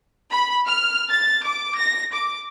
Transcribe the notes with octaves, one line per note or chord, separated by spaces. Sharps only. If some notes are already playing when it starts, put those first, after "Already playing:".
B5
F6
A6
D6
A#6
D6